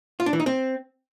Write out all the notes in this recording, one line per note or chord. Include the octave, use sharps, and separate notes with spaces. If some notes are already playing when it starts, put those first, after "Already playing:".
F4
D4
E3
D#4
C4